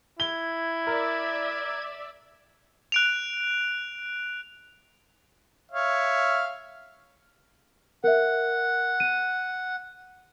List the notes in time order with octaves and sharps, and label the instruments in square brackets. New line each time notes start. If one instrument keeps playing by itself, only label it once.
[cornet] E4 [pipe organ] G#6 [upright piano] G7
[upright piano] A#4 [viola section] D5 E5
[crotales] F#6 D7 F7
[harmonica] C#5 E5 F5
[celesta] A#4 E5 [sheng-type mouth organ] F#5
[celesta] D#7